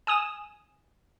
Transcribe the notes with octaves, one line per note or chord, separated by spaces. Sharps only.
G#5 D#6 E7